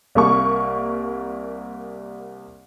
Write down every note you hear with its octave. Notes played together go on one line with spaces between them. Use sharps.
C2 A#3 C#6